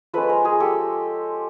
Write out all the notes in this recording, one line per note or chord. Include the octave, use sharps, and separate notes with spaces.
F3 G#3 C#4 A4 B4
A#4 C5
G#4 A#4
G4 A4